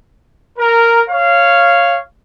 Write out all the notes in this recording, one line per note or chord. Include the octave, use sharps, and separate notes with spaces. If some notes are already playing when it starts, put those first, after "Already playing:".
A#4
C#5 F5